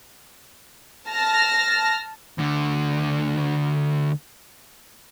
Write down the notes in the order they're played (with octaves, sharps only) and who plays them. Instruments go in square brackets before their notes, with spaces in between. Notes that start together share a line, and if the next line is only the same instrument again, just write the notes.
[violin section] A5 F6 A#6
[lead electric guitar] D2 D3